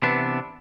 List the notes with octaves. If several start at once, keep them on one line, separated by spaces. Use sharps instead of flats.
C3 E3 B3 D4